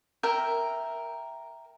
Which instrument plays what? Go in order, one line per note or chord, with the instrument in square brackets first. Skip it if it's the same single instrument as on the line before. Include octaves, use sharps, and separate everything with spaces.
[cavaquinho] A#4 E5 G5